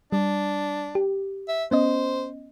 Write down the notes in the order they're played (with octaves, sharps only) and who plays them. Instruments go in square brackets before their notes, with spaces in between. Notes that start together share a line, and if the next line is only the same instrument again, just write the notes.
[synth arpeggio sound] G3 [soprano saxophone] D4
[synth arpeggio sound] G4
[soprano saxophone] E5
[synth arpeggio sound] B3 C#4 D#5 [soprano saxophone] C5